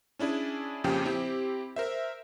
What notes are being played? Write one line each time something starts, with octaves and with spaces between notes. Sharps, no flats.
C#4 D4 E4 G#4 D5
F2 A#2 C#3 F3 G4 G5
C4 E4 G4
A#4 C5 E5